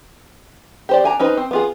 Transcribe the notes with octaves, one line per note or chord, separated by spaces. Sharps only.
G4 C5 D5
D4 G#5 A#5
C#4 D#4 B4 C5
C4
B3 F4 G#4